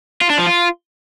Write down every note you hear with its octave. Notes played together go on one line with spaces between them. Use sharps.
F4
D4
F3
F4